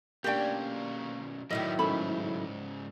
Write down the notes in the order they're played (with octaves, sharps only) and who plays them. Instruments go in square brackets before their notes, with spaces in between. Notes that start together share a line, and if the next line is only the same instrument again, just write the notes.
[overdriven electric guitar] B1 C#4 [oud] A#3 D4 [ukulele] G4 D5 G5
[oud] F#2 A2 D#3 [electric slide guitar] F#3 E4 [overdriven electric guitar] G3 B3 [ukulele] D#5
[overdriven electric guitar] G#2 C#3 [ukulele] C#4 A4 B5